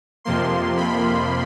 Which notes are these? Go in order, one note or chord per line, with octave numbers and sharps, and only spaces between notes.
F2 C3 F3 A#3 C6
B5